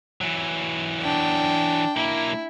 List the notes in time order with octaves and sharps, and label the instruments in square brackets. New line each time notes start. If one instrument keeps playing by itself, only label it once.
[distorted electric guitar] E3 F#3
[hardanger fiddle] D4 G5
[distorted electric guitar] B1 A#3 [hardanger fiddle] E4